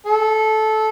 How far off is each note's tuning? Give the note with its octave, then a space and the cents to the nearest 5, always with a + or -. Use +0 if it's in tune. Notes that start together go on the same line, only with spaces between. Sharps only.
A4 -15